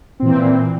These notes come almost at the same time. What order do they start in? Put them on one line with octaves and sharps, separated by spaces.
C4 A#2 E3